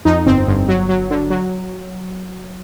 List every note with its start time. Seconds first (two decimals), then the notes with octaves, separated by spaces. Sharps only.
0.05 F2 D#4
0.26 G1 C4
0.48 G1
0.68 F#3
0.89 F#3
1.11 D3
1.30 F#3